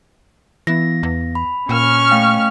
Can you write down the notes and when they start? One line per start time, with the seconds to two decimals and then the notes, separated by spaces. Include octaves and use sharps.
0.67 E3 B3 A#6
1.03 E2
1.35 B5
1.69 A#2 C#4 C#6 F6
2.11 A3 F5 G5